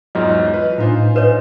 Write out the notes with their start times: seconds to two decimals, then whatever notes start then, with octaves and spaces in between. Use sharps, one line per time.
0.15 E2 G#2 F#3 F4 D#5
0.53 B4
0.78 A2 D4 D#4 F4 C5 G#5
1.16 B4 C#5 D#5 G#5